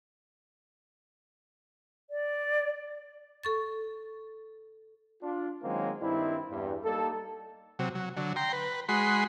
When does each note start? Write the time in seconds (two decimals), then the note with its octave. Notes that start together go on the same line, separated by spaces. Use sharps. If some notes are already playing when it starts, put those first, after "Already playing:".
2.10 D5
3.43 A4 C#6 A6
5.21 D4 F4
5.63 D#3 F#3 G#3 A#3 C4 C#4
6.00 G2 D#3 C4 D4 E4
6.50 E2 G2
6.84 G3 A#3 D#4 A4
7.79 C3 F#3
7.95 F#3
8.17 D3 F#3
8.36 G5 A#5 C6
8.53 B4
8.89 G#3 F#4 B5 C6